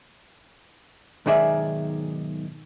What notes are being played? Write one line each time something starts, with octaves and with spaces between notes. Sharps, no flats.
B1 G#2 D#3 G#4 D5 E5